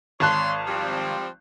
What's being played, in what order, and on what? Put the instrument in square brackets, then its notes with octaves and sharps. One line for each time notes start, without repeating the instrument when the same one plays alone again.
[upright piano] G#1 A5 F#6 [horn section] C#5 C6
[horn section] F3 G3 C4